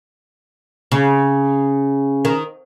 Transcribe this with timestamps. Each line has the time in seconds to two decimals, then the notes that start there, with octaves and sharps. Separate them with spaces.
0.92 C#3
2.25 D#3